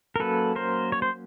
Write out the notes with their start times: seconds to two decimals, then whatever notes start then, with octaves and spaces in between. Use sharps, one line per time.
0.16 A#4
0.19 F#3 A#3 C#4 A4 B4
0.56 A#4 C5
0.92 C#5
1.02 C5